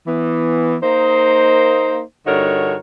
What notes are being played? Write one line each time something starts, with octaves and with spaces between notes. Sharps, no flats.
E3 B3
A#3 D#4 C5
G2 D3 D#4 F#4 A#4 C#5